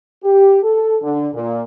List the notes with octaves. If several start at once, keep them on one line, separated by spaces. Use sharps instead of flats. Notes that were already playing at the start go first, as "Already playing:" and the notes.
G4
A4
D3
A#2